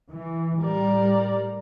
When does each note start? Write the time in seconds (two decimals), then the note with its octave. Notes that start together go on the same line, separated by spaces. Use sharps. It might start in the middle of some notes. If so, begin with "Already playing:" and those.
0.11 E3
0.62 A2 G3 A#4 D5